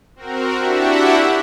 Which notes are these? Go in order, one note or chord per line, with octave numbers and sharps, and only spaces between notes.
C4 F#4 A#4
D4 E4 F#4 G4 E5 F#5